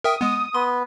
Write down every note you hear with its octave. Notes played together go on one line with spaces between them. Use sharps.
A#4 E5 G5 D#6
G#3 B3
B3 C6